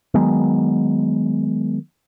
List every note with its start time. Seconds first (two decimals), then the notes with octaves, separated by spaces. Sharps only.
0.14 D#3 F#3 G#3 B3